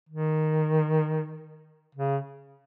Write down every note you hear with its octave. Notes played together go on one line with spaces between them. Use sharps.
D#3
C#3